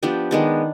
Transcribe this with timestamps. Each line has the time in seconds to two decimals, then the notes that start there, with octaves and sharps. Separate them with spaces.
0.03 F3 B3 D4 G4
0.31 D#3 G#3 B3 D4